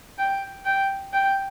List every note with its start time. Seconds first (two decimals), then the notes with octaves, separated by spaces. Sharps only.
0.18 G5
0.65 G5
1.13 G5